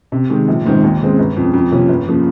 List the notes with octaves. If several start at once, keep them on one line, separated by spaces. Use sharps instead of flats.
C3
D#3 G#3
A#1
G#2 D#3 G#3 C4
D#2
C#3 G#3 C4
G1
F2 C#3
F2
C3 F3 A#3 C#4
G1
C#3 F3 A#3